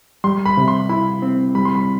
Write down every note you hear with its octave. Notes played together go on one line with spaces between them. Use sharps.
G3 C6
B5
C3
C6
E4 B5
C4
G3 B5
C6
B5